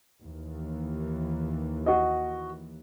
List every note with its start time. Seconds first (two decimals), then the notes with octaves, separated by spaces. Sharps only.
0.23 D#2 E3
1.86 F#4 D#5